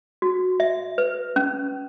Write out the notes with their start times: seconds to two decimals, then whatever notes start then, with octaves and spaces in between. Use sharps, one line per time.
0.22 F#4
0.60 E5
0.98 B4
1.36 C#4